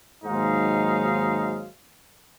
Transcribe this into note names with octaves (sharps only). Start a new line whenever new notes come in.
D#2 G#2 F#3 D#4 F5